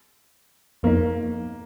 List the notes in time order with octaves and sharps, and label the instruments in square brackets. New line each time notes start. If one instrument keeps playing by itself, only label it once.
[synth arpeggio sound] F2 F3 D#4 [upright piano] A#3